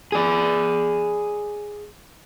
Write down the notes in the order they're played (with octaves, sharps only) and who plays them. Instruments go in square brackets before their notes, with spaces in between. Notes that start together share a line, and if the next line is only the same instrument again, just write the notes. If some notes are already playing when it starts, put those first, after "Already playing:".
[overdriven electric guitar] G#4 D5